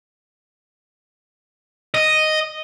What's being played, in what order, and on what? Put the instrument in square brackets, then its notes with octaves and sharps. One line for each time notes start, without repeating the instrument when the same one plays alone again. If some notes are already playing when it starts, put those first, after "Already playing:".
[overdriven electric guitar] D#5